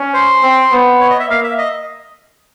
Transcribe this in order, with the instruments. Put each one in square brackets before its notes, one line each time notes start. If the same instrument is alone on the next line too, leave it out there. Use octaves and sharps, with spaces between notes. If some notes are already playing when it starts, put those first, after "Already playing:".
Already playing: [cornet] C#4
[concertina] C5
[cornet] C4
B3
[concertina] C#5
D#5
E5
[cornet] A#3 [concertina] F5
[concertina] E5
D#5